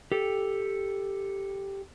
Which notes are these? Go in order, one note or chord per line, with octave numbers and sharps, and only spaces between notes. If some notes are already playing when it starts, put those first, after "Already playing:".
G4 A4